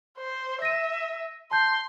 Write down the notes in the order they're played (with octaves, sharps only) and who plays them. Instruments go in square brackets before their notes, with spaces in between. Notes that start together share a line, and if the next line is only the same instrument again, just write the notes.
[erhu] C5
[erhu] E5 [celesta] A#6 D#7
[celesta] A5 G6 [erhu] C6